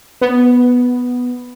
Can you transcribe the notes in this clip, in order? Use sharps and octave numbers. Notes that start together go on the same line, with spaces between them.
B3